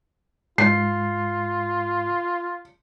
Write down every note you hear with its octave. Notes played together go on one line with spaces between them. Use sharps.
G#2 F4 C7